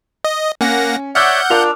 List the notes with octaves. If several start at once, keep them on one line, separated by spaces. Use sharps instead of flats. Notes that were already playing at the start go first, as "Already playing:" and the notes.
D#5
A#3 C#4 F#5 A#6
C#5 D5 E5 F#5 D6 E6 F6 G6
D4 F4 A#4 F7